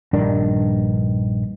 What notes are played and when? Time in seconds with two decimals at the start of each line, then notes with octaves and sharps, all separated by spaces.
0.13 A#1 G2 D#3 D4